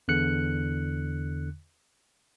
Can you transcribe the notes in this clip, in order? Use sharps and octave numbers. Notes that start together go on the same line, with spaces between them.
E2 D3 F#6 C#7